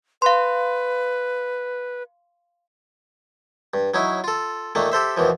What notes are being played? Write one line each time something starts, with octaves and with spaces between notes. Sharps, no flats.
B4 F5 C6
G2
F#3 C#4 D#4 E4
F4 A4
A#2 D#3 A3 A#3
G4 A4 C5 E5
D#2 B2 E3 F3